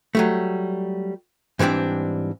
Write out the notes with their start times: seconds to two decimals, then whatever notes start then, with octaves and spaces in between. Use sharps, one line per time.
0.15 F#3 G3 A3
1.59 G#2 E3 G3 C4 D4